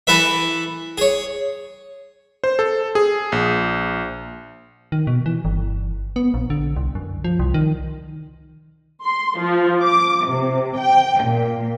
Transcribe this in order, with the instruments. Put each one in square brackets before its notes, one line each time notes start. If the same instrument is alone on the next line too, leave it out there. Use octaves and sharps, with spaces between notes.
[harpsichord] E3 E4 A4 B4 E5
G#4 C#5
[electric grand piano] C5
A4
G#4
A#1
[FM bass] D#3
B2
E3
G1
B3
A#1
D3
C2
F#2
F3
C2
D#3
[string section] C6
F3
D6
C3
G5
A#2